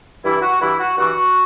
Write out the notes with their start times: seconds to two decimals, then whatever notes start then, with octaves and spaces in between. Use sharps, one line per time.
0.25 G2 E3 G3 E4
0.42 F#4
0.61 G2 E3 G3 E4
0.80 F#4
0.97 G2 E3 G3 F#4